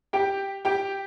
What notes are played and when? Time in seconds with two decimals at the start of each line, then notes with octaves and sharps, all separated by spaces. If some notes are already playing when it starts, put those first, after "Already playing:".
0.13 G4 G5
0.65 G4 G5